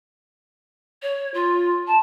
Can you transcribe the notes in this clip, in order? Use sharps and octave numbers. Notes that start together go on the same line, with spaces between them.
C#5
F4
A5